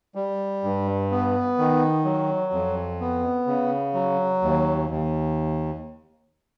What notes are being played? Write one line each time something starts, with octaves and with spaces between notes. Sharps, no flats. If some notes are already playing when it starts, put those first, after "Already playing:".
G3
G2
B3
D#3
F#3
F2
B3
C#3
F#3
D#2
D#2